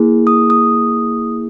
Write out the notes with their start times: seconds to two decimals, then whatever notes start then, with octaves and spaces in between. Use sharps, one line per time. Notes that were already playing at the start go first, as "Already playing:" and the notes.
Already playing: A#3 E4 G#4
0.27 D#6
0.50 D#6